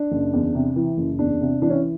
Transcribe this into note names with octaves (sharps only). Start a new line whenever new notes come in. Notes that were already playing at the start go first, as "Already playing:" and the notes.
Already playing: D4
F#1
E2
C3
E3
F#1
E2 D4
C3
E3 D4
C#4